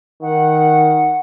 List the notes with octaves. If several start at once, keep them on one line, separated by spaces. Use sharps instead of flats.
D#3 F#5